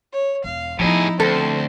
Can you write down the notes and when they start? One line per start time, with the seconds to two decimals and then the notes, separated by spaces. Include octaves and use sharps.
0.12 C#5
0.44 E1 F5
0.79 A2 F3 B3 D#4 E4 G#4
1.20 D2 C4 A4 C5